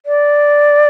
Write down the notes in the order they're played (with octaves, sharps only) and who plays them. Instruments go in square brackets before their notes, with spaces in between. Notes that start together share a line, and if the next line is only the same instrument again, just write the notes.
[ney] D5